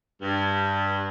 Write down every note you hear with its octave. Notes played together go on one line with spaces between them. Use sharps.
G2